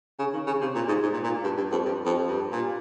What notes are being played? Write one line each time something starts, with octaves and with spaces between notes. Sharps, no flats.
C#3
D#3
C#3
C3
A#2
G#2
G#2
A#2
A#2
G2
G2
F2
G2
F2
G2
A#2